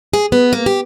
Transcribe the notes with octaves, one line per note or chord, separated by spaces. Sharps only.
G#4
B3
A#3
G4